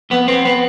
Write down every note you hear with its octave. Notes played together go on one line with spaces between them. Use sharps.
F2 B3
C4
B3